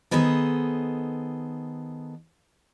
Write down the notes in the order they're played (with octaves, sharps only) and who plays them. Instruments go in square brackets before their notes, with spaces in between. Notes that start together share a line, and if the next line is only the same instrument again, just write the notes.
[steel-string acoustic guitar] D#3 B3 G#4 A4 C5